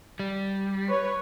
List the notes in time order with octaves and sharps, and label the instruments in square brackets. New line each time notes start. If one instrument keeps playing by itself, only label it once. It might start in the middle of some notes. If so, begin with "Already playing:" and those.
[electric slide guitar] G3
[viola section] B4 C#5